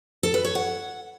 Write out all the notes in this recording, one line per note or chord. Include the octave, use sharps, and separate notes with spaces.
A4
B4
C#5
F#5